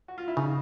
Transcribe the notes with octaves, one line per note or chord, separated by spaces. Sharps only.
F#4
F4
E4
C#3 D#4